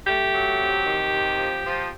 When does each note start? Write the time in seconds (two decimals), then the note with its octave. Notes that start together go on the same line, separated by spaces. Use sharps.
0.06 A3 G4
0.33 F#3
0.59 C3
0.85 D#3
1.12 C3
1.38 F3
1.64 F3